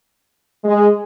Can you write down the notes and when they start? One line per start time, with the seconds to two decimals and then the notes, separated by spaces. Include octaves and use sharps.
0.65 G#3